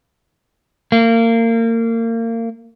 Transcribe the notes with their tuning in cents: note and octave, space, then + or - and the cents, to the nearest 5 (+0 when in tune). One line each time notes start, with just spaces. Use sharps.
A#3 -30